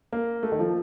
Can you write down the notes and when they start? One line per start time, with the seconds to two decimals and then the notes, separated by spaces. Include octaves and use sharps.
0.13 A#3
0.43 A3
0.52 D#3
0.59 F3